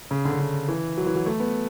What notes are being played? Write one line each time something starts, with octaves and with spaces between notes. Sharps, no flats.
C#3
D3
C#3
D3
E3
F#3
E3
F#3
A3
B3